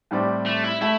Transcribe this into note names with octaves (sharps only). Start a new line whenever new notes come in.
A2 G3 C4 G4 D5
A3
E4
A3 E4